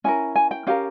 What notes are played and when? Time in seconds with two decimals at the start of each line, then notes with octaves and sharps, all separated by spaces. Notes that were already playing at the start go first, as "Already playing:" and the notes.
0.04 C#4 E4 A#4 G#5
0.36 G#5
0.51 G5
0.67 C#4 G4 A#4 F5